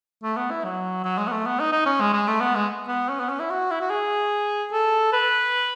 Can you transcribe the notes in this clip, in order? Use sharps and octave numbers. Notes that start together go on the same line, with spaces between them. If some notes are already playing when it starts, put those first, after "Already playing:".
A3
B3
E4
F#3
F#3
G#3
B3
A3
B3
D#4
D#4
C#4
G#3
G#3
A3
B3
G#3
B3
C#4
B3
C#4
E4
F#4
E4
F#4
G#4
A4
B4